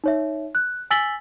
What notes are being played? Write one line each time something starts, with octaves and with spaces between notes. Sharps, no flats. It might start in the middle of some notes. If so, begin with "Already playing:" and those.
D#4 C#5 E5
F#6
G#5 E6 A6 B6 F#7 G7